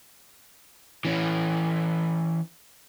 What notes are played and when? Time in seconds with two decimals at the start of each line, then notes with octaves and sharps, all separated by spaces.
1.05 E3 C#4